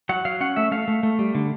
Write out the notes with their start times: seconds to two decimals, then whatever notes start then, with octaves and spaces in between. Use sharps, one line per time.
0.09 F#3 F#5
0.25 F#3 F5
0.41 C#4 F#5
0.56 A3 E5
0.72 A3 F5
0.88 A3
1.03 A3
1.19 G3
1.35 D3